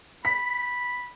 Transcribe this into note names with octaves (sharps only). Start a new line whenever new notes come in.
B5 B6